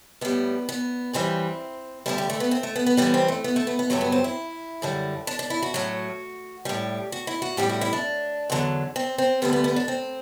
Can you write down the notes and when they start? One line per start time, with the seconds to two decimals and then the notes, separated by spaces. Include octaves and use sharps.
0.21 A2 G3 B3
0.69 B3
1.13 F#2 E3 G3 C4
2.06 D2 D3 G3 E4
2.18 G4
2.30 A3
2.40 B3
2.51 C4
2.63 A3
2.76 B3
2.86 B3
2.97 F#2 E3 G3 B3
3.14 C4
3.28 A3
3.44 B3
3.56 A3
3.67 B3
3.79 B3
3.90 G2 D3 F#3 A3
4.01 B3
4.12 C4
4.24 E4
4.82 F#2 D3 G3
5.27 D4
5.39 D4
5.50 E4
5.63 F#4
5.74 A2 F#3
6.65 A2 G3 G4
7.12 F#4
7.27 E4
7.42 F#4
7.57 A2 G3 G4
7.69 F#4
7.81 E4
7.93 D4
8.50 E2 D3 F#3
8.96 C4
9.18 C4
9.42 D2 D3 G3 B3
9.53 B3
9.64 B3
9.76 D4
9.88 C4